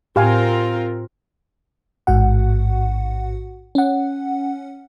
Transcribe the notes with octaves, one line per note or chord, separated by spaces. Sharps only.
A2 C4 F4 G4 A#4 F5 G#5
A1 G#2 F#4 F#5
C#4 F#5